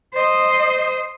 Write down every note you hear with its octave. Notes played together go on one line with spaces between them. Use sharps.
C5 D#5